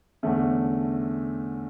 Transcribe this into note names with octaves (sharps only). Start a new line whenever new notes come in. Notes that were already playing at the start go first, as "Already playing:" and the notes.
E2 D3 A3 C#4